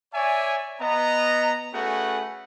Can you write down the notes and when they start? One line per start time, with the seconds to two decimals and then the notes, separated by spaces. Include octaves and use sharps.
0.14 C#5 D5 E5 G#5
0.80 B3 D#5 A#5
1.73 A3 C#4 F#4 G#4 B4 F#5